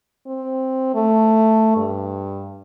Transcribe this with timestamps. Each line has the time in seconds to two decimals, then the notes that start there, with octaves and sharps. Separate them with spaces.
0.27 C4
0.95 A3
1.76 G2